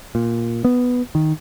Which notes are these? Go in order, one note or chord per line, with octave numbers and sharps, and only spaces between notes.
A#2
B3
D#3